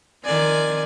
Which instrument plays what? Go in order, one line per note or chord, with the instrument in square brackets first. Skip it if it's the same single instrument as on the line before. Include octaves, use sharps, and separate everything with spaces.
[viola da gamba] D#3 F3 C4 [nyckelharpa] D5 G#5